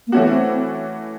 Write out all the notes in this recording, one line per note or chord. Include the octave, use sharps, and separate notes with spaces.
A#3
E3 A3 B3 C#4 F#4
C4